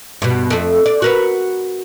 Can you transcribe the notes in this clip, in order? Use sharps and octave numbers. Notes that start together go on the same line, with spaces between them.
G2 B2
F2 A3
D5
F#4 A#4 B4